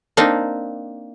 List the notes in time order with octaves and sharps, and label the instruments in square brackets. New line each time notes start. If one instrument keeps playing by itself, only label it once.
[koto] A#3 C4 D4 D#4